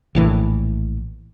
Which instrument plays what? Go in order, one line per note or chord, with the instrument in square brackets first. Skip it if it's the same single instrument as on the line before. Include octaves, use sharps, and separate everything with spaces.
[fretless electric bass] A#1 A2 E3